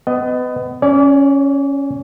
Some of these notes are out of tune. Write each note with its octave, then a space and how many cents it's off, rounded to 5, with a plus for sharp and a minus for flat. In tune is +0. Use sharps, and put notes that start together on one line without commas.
B3 +30 D#5 +0
C#4 +0 D5 -35